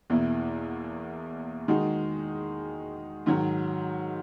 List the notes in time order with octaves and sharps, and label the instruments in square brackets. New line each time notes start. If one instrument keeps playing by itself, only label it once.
[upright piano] E2 B2 A#3 E4
D#3 G#3 D#4 F#4
G#2 D#3 F#3